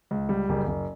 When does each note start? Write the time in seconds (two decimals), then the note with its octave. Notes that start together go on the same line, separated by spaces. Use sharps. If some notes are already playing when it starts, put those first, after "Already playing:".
0.11 C#2
0.29 G3
0.49 F#1
0.67 F#1